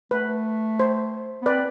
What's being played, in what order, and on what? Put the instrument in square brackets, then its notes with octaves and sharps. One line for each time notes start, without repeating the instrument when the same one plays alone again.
[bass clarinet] A3 [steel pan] B4
[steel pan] C5
[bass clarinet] B3
[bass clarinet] C4 [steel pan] B4 D5